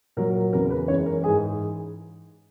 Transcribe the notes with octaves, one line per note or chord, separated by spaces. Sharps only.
A#2 F#3 A#4
A#4
E2 C#3 E3 A#4
B4
F#2 E3 G#3 C#5
A#4
G#2 E3 G#3 G#4